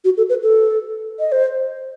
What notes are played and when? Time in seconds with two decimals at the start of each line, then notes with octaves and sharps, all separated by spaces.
0.05 F#4
0.17 A4
0.29 B4
0.43 A4
1.19 D#5
1.32 C5